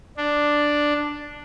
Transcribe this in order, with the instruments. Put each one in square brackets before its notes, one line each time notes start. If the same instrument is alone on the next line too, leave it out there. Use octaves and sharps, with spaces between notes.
[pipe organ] D4